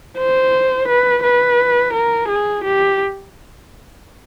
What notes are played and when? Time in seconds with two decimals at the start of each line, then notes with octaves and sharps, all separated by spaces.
0.18 C5
0.88 B4
1.23 B4
1.93 A#4
2.28 G#4
2.64 G4